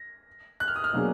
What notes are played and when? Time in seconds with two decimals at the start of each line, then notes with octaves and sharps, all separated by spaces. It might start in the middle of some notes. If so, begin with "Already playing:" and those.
Already playing: A#6
0.60 F#6
0.68 F6
0.76 D#6
0.84 F6
0.93 B2 F#3 A#3 D4 G#4